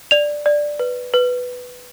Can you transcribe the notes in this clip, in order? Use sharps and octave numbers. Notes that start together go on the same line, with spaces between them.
D5 F7
D5
B4
B4